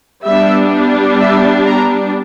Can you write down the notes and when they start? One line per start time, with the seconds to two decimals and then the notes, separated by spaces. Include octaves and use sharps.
0.24 G3 B3 D4 E5
1.19 E5
1.66 A#5